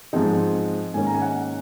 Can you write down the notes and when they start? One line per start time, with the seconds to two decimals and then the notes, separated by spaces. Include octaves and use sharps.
0.13 G#2 F3 G#3 C4 D#4
0.94 G#2 D#3 A#3 C#4 G#5
1.07 A#5
1.14 G#5
1.22 F#5